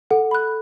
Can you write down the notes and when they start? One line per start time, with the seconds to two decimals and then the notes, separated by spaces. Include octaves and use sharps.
0.11 A4 F#5
0.31 B5 F#6